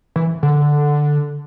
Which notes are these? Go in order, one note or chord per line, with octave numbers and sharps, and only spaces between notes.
E3
D3